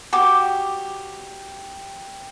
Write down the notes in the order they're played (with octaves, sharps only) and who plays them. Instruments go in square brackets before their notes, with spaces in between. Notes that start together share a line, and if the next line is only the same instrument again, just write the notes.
[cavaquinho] F#4 G4 D6 D#6